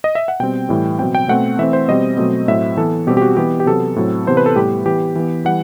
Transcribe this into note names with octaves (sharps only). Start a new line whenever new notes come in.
D#5
E5
F#5
B2 G3 C4 G5
A2 E3 G3
B2 F#3 C4 G5
G5
B2 A3 C4 F#5
E3 A3 C4 E5
C5
B2 G3 C4 D#5
B2 F#3 A3 C4
A2 F#3 C4 E5
E3 B3 A4
B2 G3 C4 G4
G4
F#4
E3 B3 G4
G4
C3 F#3 B3 A4
A2 F#3 C4
C3 E3 B3 C5
B4
A4
A2 G3 B3 G4
E3 B3 G4
E3 B3
E3 G3 F#5